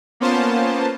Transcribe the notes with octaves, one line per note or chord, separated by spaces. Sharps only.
A#3 B3 C#4 F4 C5 A5